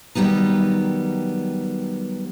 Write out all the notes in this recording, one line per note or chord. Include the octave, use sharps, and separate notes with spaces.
D#3 F#3 G3 B3 D#4